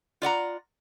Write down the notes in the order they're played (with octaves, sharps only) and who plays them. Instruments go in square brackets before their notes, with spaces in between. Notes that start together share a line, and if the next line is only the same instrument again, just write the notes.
[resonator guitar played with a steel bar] F4 D5 F#5 A#5